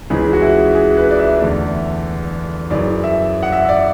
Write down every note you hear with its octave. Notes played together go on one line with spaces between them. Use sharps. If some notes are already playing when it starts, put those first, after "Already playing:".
C#2 C#3 E3 G#3 G#4
F#4
E4
G#4
B4
D5
E5
E2 D3 A3 D5
F#2 C#3 E3 D5
E5
F#5
E5
E5
D5